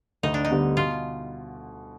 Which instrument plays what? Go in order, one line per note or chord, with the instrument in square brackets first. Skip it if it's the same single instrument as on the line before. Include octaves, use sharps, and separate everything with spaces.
[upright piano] D2 [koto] D#4
[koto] D4
D#4
[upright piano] D3 G3 B3
[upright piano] B2 [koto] F4